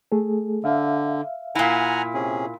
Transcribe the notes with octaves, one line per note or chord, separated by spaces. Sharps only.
A3 G#4 A4
D3 E5 F5
A#2 E4 F#5 G#5 A#5
C3 C#4 G#4